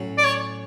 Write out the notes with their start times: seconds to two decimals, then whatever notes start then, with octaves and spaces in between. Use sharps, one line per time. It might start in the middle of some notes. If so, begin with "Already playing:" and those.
Already playing: A2 F#3 C#4 F#4
0.18 D5
0.24 C#5